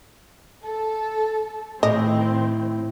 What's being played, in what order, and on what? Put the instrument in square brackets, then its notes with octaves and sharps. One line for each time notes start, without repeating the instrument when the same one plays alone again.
[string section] A4
[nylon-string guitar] A2 [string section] D#3 C4 [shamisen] D#5